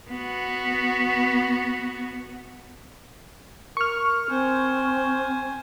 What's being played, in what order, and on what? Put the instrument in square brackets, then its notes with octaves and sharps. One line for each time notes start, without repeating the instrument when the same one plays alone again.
[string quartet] B3 F#4
[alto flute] A#4 [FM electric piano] C#6 F6
[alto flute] C4 [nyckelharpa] C5 G#5